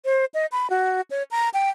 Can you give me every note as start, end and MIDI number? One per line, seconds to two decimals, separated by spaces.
0.05 0.25 72
0.34 0.46 75
0.52 0.70 83
0.70 1.01 66
1.11 1.23 73
1.31 1.49 82
1.54 1.70 79